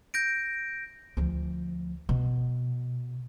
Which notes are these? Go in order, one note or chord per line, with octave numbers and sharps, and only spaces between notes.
G6 A#6 D7
D2 F3
B2